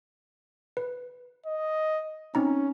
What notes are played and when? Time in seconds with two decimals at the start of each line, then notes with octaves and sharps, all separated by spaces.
0.77 B4
1.46 D#5
2.35 C4 C#4 D#4 A#5